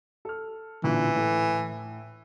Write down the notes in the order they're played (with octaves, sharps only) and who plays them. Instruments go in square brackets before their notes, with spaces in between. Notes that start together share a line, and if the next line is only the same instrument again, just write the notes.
[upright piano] A4 F6
[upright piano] A1 A#2 D3 [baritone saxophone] E3
[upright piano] A2 A4